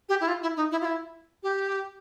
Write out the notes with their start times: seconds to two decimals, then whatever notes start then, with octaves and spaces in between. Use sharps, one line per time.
0.09 G4
0.21 E4
0.28 F4
0.42 E4
0.57 D#4
0.72 E4
0.81 F4
0.85 E4
1.43 G4